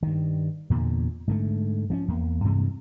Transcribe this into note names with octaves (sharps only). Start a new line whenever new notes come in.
G2 D#3
E2 A#2 D3
G#2 D3 A3
F3 C4 C#4
E2 A#3
G2 C3 E3 G#3